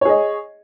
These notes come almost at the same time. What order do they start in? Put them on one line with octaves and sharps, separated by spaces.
C#5 G#4 D#5